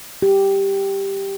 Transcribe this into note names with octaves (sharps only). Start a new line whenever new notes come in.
G4